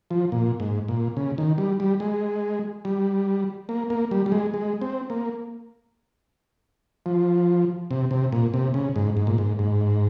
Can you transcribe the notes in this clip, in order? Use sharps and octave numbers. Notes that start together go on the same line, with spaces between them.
F3
A#2
G#2
A#2
C#3
D#3
G3
G3
G#3
G3
A#3
A#3
G3
G3
G#3
G#3
C4
A#3
F3
C3
C3
A#2
C3
C#3
G#2
G#2
A#2
G#2
G#2